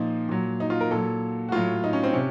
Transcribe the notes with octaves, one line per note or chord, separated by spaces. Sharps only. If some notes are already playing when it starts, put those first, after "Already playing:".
Already playing: A#2 F3 D#4
A#2 F#3
D#4
F4
A#4
A#2 F#3 A4
F#4
A2 F#3 F4
D#4
C#4
C4
C3 C#4